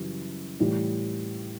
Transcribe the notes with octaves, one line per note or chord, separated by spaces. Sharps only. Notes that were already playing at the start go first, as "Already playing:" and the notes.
Already playing: F#2 C#3 E3 G3
A2 E3 G3